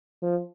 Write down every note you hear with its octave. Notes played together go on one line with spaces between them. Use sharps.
F3